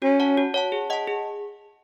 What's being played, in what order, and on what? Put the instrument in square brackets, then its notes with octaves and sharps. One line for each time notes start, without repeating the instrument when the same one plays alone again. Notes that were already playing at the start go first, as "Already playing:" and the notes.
[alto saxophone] C#4 [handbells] F#4
[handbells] C#5 F#5 A5
F#4
C#5 F#5 A5
G#4
D#5 F#5 A5
G#4